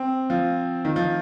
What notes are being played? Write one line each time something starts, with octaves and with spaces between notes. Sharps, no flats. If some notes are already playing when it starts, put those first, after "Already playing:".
Already playing: C4
F3
D#3
F3